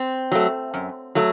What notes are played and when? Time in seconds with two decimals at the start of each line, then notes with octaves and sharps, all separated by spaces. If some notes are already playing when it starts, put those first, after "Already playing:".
Already playing: C4
0.32 F#3 A3
0.74 F#2
1.15 F#3 A3